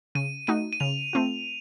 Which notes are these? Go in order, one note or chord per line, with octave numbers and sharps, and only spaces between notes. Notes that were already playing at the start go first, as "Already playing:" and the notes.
C#3 D#7
A3 D#4 F#4 D#7
D#7
C#3 F7
A3 C4 F4